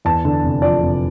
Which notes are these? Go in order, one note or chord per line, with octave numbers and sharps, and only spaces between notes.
E2 A5
D3
F1
F3 D5
F1